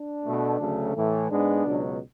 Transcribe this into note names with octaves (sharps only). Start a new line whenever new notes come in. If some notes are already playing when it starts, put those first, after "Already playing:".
Already playing: D4
B2 A3
D2 C#3 F#3 A3
A2 E3 A3
G#2 G#3 B3 D4
C#2 B2 F#3